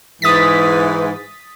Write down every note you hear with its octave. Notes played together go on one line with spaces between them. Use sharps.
G#2 E3 D#6 A6 B6